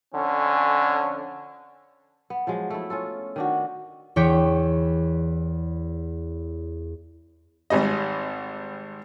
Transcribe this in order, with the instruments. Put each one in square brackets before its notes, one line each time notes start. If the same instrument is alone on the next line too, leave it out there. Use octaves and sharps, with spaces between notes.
[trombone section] F2 D3 C#4
[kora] B3
F3 F#3 G#3
A3 E4
C#4 F4 A4
D#3 D4 F#4
[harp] E2 E3 C#5 G5 D6 B6
[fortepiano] G#1 G#2 G3 D#5